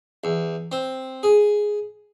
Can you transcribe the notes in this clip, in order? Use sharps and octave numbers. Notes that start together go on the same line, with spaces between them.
E2
C4
G#4